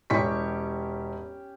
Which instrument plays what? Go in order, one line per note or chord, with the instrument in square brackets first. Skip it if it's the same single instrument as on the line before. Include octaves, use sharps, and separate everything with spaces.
[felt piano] E1 C#6 B6 [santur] C#4 G4